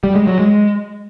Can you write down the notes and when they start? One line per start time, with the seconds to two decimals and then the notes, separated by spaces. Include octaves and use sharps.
0.04 G3
0.15 G#3
0.27 F#3
0.39 G#3